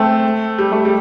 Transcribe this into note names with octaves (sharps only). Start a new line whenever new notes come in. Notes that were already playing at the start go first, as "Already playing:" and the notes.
Already playing: A3 C4
G3
A3
G3